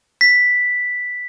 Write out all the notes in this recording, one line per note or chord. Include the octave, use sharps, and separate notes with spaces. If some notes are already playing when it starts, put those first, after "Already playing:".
B6